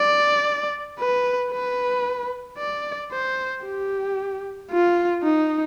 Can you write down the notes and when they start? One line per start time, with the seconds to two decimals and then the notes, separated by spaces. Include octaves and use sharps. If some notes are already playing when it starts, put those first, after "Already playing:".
Already playing: D5
0.99 B4
1.52 B4
2.58 D5
3.12 C5
3.65 G4
4.71 F4
5.23 D#4